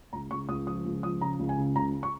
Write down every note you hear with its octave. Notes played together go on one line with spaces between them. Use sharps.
C#2 A#5
C#2 C#6
C#2 D#6
F3 D#6
C#2
F3 D#6
C#3 A#5
C#2
G#5
C#3
C#2 A#5
C#6